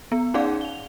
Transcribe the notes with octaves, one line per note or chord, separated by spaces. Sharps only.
B3
C#4 D#4 G#4 D5 F5 F#5
F7 G7